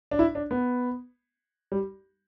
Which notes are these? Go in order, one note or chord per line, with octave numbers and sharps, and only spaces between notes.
D4
E4
D4
B3
G3